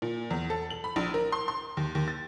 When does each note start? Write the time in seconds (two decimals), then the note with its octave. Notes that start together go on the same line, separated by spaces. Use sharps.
0.02 A#2
0.30 E2
0.50 A4
0.71 F#7
0.84 B5
0.96 A#1
1.14 A#4
1.32 C6
1.48 C6
1.77 D#2
1.95 D#2
2.08 A6